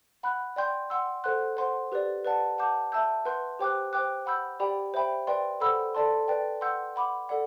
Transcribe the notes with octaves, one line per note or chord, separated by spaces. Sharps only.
F#5 B5 F#6
D5 G5 C6 G6
F#5 C6 E6
A4 C5 F#5 C6 F#6
C5 F#5 C6
G4 B4 D5
B4 D5 F#5 A5
F#5 A5 D6 G6
E5 A5 E6 G6
B4 F#5 C6 G6
G4 C5 G5 D6 F#6
C5 G5 D6 F#6
F#5 B5 E6 G6
G4 D5 G5 B5
C5 E5 G5 B5
B4 D5 G5 C6
A4 C5 F#5 B5 E6
A4 D5 A5 C6
B4 D5 G5
F#5 C6 E6 G6
F#5 B5 D6
A4 D5 F#5